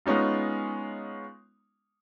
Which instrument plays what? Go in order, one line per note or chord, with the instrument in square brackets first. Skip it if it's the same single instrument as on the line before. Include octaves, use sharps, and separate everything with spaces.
[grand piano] G#3 B3 C#4 D#4 F4